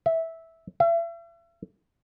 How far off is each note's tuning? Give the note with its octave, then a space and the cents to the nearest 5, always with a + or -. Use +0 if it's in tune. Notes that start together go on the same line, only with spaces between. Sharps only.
E5 -10
E5 +40